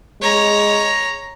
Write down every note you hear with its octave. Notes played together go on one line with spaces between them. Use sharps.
G#3 C#5 A#5